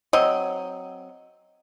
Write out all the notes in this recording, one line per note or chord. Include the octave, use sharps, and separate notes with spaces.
F#3 C4 D#5